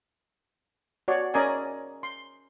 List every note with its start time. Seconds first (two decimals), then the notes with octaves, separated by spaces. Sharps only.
1.08 F#4 C#5 D5
1.34 C#4 A#4 D5 D#5 G#5
2.03 C6